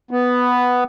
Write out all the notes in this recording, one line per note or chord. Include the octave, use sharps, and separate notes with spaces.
B3